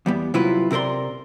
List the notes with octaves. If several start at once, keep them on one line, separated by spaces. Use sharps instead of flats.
E2 G3 B3
C3 F#3 E4 F4 B4
C3 C4 A#4 D5 C6